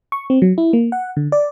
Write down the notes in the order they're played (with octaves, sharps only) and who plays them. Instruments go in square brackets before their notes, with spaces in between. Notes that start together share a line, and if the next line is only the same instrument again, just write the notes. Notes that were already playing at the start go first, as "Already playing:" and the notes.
[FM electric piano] C#6
C4
F#3
E4
A#3
F#5
D3
D5